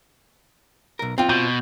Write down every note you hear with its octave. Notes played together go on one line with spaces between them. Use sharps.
B1 A#4
C4 F4 G5
B2 G6